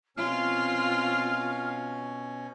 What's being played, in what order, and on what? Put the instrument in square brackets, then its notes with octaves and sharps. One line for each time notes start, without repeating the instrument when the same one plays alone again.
[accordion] B2 C#4 [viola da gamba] C4 F4 [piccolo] F6